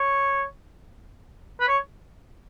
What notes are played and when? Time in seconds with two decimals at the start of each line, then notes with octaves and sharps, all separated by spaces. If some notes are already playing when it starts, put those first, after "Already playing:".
Already playing: C#5
1.60 B4
1.68 C#5